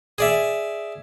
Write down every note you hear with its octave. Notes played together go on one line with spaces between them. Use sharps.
G#4 D5 E5